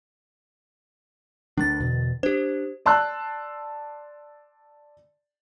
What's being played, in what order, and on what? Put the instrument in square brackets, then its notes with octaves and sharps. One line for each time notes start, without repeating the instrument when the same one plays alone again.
[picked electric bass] D2 A3 D4 [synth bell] D3 A6
[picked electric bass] E2 B2
[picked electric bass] D4 [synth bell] G4 C5
[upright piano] D5 A5 C6 E6 F#6